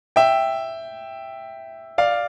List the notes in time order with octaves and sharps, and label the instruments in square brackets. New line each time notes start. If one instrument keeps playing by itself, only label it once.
[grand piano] E5 G5
D5 F5